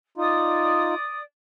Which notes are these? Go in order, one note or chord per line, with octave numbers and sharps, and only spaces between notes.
D#4 F4 D5 D#6